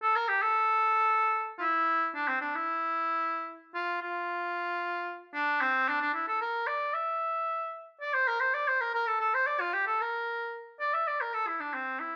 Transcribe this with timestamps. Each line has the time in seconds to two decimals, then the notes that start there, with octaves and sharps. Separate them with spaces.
0.02 A4
0.16 A#4
0.28 G4
0.42 A4
1.58 F4
1.61 E4
2.15 D4
2.28 C4
2.41 D4
2.55 E4
3.75 F4
4.02 F4
5.34 D4
5.61 C4
5.88 D4
6.02 D4
6.14 E4
6.28 A4
6.41 A#4
6.67 D5
6.94 E5
8.02 D5
8.14 C5
8.28 A#4
8.40 C5
8.54 D5
8.68 C5
8.81 A#4
8.95 A#4
9.07 A4
9.21 A4
9.34 C5
9.47 D5
9.60 F4
9.73 G4
9.87 A4
10.01 A#4
10.80 D5
10.94 E5
11.07 D5
11.21 A#4
11.34 A4
11.47 E4
11.60 D4
11.74 C4
12.00 E4